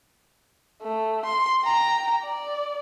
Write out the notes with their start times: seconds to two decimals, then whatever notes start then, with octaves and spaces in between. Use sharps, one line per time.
0.82 A3
1.25 C6
1.64 G5 A#5
2.23 D5